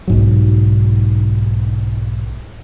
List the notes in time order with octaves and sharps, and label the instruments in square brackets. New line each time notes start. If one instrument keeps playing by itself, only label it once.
[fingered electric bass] B1 G#2 F#3